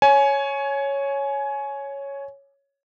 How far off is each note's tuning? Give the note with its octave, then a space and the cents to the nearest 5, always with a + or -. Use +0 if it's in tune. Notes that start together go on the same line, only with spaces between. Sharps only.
C#5 +0 G#5 +20